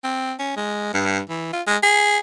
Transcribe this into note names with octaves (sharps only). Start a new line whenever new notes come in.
C4
C#4
G#3
G2
E3
F4
G#3
G#4